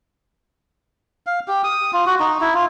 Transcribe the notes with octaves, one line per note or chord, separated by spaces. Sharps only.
F5
G4
D#6
F4
F#4
D#4
E4
F4